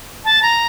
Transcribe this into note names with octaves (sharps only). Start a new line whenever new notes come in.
A5
A#5